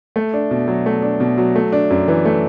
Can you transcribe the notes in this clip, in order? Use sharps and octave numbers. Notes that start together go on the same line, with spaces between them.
A3
D4
B2
F#3
A3
D4
B2
F#3
A3
D4
F#2
E3
A3